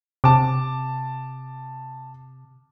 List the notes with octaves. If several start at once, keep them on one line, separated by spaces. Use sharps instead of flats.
C3 A5 D6